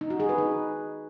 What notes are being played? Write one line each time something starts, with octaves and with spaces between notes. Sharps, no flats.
D#4
F#4
G#4
B4
D#4